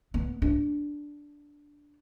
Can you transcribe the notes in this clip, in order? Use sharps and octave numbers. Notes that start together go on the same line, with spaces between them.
B3
D4